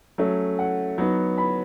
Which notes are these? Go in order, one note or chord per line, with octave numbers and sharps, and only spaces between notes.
F#3 A3 C#4
F#5
F#3 B3 D#4
B5